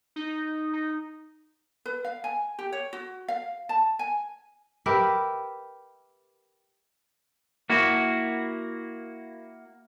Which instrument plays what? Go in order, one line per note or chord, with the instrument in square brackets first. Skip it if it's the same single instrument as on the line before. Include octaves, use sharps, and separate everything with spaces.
[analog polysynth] D#4
D#4
[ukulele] B4
F5
G#5
G4
C#5
F#4
F5
A5
G#5
[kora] G4 A#4 B4 E5
[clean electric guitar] A#3 E4 F#4